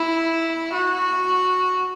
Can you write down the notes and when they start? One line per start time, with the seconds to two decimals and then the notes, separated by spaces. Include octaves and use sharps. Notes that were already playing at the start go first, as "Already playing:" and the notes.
Already playing: E4
0.73 F#4